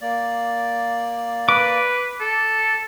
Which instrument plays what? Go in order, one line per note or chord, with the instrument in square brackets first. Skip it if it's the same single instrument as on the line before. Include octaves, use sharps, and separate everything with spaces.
[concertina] A#3 D5
[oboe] B4 [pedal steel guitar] D6
[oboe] A4